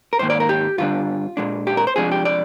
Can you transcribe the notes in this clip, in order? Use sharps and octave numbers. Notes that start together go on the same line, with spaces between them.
A#4
G#2 D#3 A#3 C5
D5
A#4
G4
G2 D3 G3 D4 F4
A#2 G#3 D4
G4
A#4
C5
C3 F3 G#3 D4 G#4
G4
D5